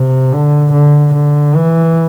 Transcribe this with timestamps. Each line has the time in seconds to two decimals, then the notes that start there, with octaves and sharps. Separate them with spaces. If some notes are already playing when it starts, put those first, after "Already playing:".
Already playing: C3
0.32 D3
0.73 D3
1.14 D3
1.55 E3